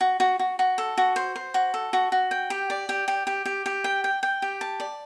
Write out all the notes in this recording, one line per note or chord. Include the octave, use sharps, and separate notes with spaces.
F#4
F#4
F#4
F#4
A4
F#4
C5
C5
F#4
A4
F#4
F#4
G5
G4
D5
G4
G4
G4
G4
G4
G5
G5
G5
G4
A5
D5